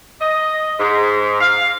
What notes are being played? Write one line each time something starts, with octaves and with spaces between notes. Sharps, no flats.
D#5
G#2
F5